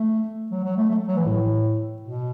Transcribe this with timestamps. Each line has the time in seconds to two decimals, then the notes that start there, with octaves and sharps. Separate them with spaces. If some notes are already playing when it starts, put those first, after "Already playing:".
Already playing: A3
0.52 F#3
0.64 F#3
0.77 A3
0.90 A3
1.08 F#3
1.17 E3
1.26 A2
2.02 B2